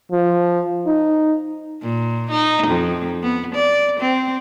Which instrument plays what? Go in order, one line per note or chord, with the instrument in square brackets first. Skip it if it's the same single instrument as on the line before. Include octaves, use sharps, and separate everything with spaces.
[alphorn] F3
D#4
[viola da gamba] A#2
D#4
F2
B3
D5
C4